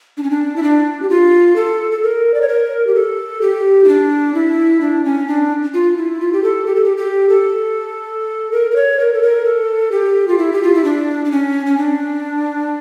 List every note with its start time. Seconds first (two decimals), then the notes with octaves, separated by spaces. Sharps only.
0.17 D4
0.23 C#4
0.31 D4
0.56 E4
0.63 D4
1.02 G4
1.10 F4
1.56 A4
1.92 A4
2.03 A#4
2.34 D5
2.41 C#5
2.48 A#4
2.87 G4
2.95 A4
3.41 G4
3.84 E4
3.88 D4
4.34 E4
4.81 D4
5.05 C#4
5.28 D4
5.74 F4
5.97 E4
6.21 F4
6.33 G4
6.43 A4
6.66 G4
6.75 A4
6.85 G4
6.97 G4
7.29 A4
8.52 A#4
8.71 A#4
8.76 C#5
8.99 A#4
9.14 A4
9.22 A#4
9.45 A4
9.92 G4
10.28 F4
10.38 E4
10.53 G4
10.63 F4
10.75 E4
10.84 D4
11.25 D4
11.32 C#4
11.66 C#4
11.78 D4